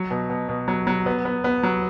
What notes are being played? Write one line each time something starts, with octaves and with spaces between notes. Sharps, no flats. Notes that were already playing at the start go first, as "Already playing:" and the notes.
Already playing: F#3
B2
B2
B2
F#3
F#3
B3
B3
B3
F#3